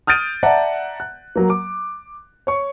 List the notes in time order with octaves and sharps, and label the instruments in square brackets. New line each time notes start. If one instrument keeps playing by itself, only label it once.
[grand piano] D#6 F6 G6 A6 D7 D#7
D5 E5 F#5 A5 A#5
F#6
F#3 A#3
D6
C#5 C#6